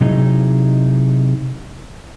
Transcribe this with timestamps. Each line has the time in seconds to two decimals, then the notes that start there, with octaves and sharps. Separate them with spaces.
0.01 C3 F#3 D#4 E4 G#4